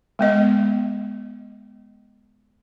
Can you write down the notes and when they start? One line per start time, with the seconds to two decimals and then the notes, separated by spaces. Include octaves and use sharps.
0.19 G#3 B3 D#5